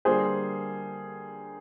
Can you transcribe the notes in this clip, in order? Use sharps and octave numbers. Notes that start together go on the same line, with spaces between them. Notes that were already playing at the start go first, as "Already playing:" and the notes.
D3 G3 A#3 G#4 C5